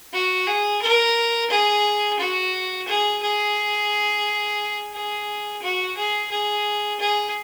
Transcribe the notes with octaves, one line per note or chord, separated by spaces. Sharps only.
F#4
G#4
A#4
G#4
F#4
G#4
G#4
G#4
F#4
G#4
G#4
G#4